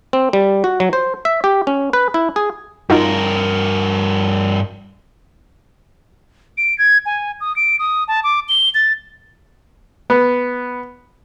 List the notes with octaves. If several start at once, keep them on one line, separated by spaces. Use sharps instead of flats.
C4
G3
F#4
F#3
C5
E5
G4
C#4
B4
E4
G#4
G2 D#4 F4 F#4 A#4
D7
G#6
G#5
D#6
D7
D#6
A5
D6
G7
A6
B3